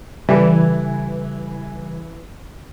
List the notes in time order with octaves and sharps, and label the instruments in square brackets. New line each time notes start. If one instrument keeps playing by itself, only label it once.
[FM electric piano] C#3 G#5 [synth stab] E3 [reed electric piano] G3 G4 A4